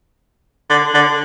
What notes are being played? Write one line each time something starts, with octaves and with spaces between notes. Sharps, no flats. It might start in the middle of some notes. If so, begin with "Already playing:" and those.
D3
D3